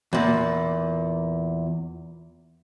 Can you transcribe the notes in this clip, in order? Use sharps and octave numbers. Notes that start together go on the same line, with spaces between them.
E2 A#2